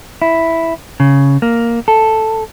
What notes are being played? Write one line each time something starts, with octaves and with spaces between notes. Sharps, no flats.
E4
C#3
A#3
A4